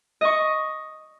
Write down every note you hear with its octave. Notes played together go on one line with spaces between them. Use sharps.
D#5 C#6